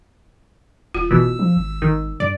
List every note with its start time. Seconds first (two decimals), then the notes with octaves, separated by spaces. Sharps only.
0.94 D#1 F4
1.11 A1 B2 E3 E6
1.39 F3
1.57 G#1
1.82 G#1 D#3
2.20 G2 D5